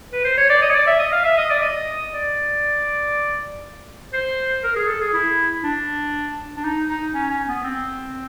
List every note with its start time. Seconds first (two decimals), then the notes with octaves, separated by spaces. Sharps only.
0.12 B4
0.25 C5
0.37 C#5
0.49 D5
0.62 D#5
0.70 C#5
0.74 D5
0.87 E5
0.99 D#5
1.12 F5
1.25 E5
1.37 D#5
1.50 D5
1.62 D#5
2.13 D5
4.13 C5
4.64 A#4
4.76 G#4
4.88 A4
5.01 G#4
5.14 E4
5.63 D4
6.57 D4
6.64 D#4
6.89 D#4
7.14 C#4
7.30 C#4
7.48 B3
7.64 C4